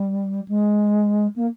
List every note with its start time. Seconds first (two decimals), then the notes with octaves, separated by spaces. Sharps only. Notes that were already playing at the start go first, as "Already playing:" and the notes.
Already playing: G3
0.48 G#3
1.36 A#3